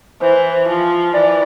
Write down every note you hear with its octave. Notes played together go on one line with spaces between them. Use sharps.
E3 C5
F3
E3 D5